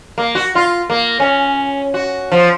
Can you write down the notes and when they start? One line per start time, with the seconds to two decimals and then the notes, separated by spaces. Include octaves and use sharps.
0.18 A#3
0.35 F#4
0.55 F4
0.90 A#3
1.20 C#4
1.94 F#4
2.32 F3